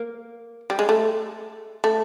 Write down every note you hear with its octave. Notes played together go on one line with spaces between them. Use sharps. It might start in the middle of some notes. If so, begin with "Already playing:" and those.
Already playing: A#3
G3
G#3
A3
A3